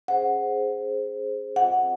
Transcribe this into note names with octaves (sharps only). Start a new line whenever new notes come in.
C#4 G#4 C5 F#5
C4 F4 C5 D#5 F#5